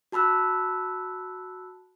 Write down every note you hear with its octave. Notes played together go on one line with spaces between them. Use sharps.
F#4 A5 B5 E6 F#6